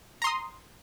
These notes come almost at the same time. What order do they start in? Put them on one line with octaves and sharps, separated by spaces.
A#5 C6 D#6